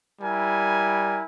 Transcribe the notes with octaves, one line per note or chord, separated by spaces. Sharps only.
G3 E4 A#4 G#5